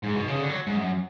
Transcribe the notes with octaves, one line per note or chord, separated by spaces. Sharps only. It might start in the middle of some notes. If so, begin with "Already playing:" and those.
G#2
B2
C#3
D3
F#3
G#2
F#2